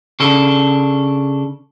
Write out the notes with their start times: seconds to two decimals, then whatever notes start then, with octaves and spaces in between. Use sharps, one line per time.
0.20 C#3 D4 A4